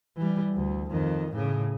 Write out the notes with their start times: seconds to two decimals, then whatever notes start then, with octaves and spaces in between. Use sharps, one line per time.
0.17 E3 G3
0.54 D2
0.91 F2 D#3
1.32 A2 C#3